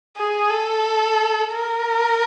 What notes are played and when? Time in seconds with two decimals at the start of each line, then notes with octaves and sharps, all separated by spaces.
0.17 G#4
0.50 A4
1.52 A#4